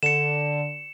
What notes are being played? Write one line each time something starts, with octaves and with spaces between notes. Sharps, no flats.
D3 C#7 E7